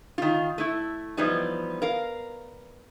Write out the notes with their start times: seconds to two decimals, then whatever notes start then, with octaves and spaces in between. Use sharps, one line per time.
0.18 D#3 F4
0.58 A3 E4
1.17 E3 F3 G3 B3 D#4
1.82 A#4 F5